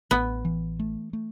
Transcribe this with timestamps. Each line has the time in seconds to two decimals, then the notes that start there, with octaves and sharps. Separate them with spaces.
0.11 A1 B3
0.45 E3
0.79 A3
1.13 A3